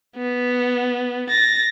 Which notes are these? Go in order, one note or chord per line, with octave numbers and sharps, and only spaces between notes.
B3
A6 A#6